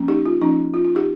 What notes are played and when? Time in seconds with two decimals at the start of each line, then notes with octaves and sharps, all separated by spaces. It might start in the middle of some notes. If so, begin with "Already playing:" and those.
Already playing: F3 A#3 C#4
0.08 D#4 G4
0.26 F4
0.41 F3 A#3 C#4 D#4
0.74 F4
0.85 F4
0.95 D#4 G4